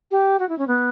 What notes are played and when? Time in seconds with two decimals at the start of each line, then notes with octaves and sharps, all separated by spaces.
0.11 G4
0.40 F#4
0.49 E4
0.58 C#4
0.68 B3